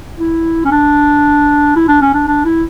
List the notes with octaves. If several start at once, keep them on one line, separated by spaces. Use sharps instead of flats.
E4
C#4
D4
E4
D4
C#4
D4
D4
E4